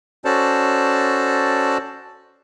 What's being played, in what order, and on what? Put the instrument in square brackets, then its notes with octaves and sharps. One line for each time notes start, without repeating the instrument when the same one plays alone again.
[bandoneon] C#4 F#4 A4 C5 D5 A5